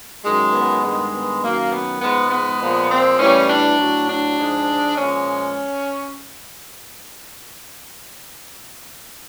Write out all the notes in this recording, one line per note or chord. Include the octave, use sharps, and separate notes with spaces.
F#2 D#3 G#3
B3
G2 D#3 G#3
B3
F#2 D#3 F#3 A#3
B3
G#2 F3 G#3 B3
B3
A#2 F3 G#3
C4
A2 E3 G3 C#4
D4
A2 F#3
D4
G#2 F3 G#3
A#2 F3 G#3 C#4